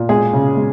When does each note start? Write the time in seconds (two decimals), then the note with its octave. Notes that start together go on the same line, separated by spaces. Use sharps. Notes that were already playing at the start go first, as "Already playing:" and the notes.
Already playing: A#2
0.09 G#3 G#4
0.33 C#3
0.57 G#3